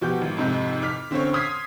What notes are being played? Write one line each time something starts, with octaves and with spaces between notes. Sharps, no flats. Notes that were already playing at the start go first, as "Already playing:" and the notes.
B2 F3 F#4 G4 D6 G6
G#1
F2 G#2 C3 D#4 G6
D6 F6 B6
D3 C4 C#4 C5 C#5
C6 D#6 F6 G#6 B6 C7